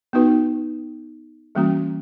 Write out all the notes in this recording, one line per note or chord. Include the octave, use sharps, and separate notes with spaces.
B3 D#4 F#4 B4
E3 G3 A#3 C#4 F#4